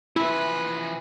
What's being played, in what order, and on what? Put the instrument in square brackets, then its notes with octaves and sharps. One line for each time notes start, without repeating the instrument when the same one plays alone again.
[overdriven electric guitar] E3 F3 [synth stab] E4 [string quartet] B4